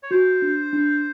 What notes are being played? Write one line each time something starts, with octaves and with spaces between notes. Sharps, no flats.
C#5
F#4 C5
D4
D4